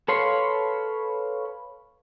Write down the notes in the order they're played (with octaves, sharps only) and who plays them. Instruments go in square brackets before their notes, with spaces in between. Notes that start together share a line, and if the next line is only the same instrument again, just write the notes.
[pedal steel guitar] A4 B4 C#5 F5 C6